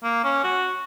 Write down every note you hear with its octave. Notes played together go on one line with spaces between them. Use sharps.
A#3
C#4
F#4